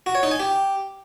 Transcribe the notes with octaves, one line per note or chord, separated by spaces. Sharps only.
F#4
C#5
D#4
G#5
G4